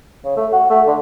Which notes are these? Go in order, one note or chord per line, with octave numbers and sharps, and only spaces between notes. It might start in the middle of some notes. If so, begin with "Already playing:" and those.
C#3
A3
F#4
A3
D3